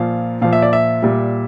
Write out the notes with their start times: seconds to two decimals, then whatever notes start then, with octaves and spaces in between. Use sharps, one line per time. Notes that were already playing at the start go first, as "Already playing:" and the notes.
Already playing: A#2 F3 F5
0.42 A#2 F3 F5
0.53 E5
0.62 D5
0.73 E5
1.02 A#2 G3